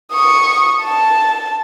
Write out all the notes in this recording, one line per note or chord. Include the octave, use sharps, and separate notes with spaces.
C#6 D#6
A5